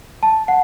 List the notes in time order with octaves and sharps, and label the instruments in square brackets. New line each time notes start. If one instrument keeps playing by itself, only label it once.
[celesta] A5
F#5